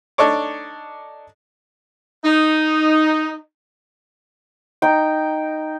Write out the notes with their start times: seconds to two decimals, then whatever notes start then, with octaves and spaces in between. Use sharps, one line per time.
0.18 D4 D#4 A4 C#5 D6
2.25 D#4
4.82 D#4 G5